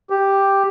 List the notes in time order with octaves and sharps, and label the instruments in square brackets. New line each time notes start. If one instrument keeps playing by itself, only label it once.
[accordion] G4